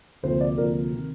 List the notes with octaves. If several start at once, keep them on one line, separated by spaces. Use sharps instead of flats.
D2 C3 F3 A#3 C5
D5
D2 C3 F3 A#3 A#4
C3 D#3